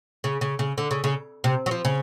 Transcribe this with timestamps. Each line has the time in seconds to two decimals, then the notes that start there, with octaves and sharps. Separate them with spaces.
0.24 C#3
0.41 C#3
0.59 C#3
0.78 D3
0.91 C#3
1.04 C#3
1.44 C3
1.66 F#3
1.71 F3
1.85 C#3